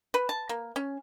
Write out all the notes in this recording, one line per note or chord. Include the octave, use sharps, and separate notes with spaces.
B4
A5
A#3
C#4